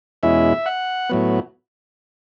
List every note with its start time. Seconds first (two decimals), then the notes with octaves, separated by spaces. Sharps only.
0.23 E2 B2 G#3 C#4 E4 E5
0.66 F#5
1.09 A2 F#3 B3